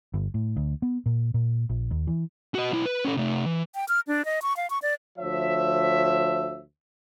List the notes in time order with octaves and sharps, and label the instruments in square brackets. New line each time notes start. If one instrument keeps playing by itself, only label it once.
[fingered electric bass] G1
A2
D2
B3
A#2
A#2
A#1
D#2
E3
[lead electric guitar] F#4 D#5
B1 E4
B4
C#4 A4
C3 A3
E3
[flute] G5
F6
D4
D#5
C#6
F5
C#6
D5
[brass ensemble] D2 F3 C#5 E5